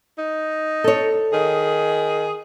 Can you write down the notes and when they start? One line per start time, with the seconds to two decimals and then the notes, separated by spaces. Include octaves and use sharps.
0.18 D#4
0.84 A4 C#5
1.33 D#3 G#4